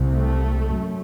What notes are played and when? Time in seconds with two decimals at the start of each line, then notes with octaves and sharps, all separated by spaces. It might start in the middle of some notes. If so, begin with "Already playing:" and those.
Already playing: C2 C3
0.12 A3
0.72 F#2